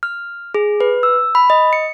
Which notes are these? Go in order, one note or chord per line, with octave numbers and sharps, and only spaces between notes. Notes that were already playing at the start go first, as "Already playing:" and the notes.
F6
G#4
B4
E6
B5
D#5
C#7